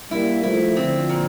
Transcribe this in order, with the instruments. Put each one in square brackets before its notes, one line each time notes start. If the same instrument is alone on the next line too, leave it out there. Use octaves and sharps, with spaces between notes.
[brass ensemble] G3 A#3 [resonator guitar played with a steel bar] E4
[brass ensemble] F3 A3 [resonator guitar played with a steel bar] E4
[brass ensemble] D3 F3 [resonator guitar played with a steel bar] C4
[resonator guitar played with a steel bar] A#2